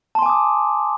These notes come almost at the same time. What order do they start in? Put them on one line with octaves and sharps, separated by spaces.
A5 C6 G#5 D6 D#6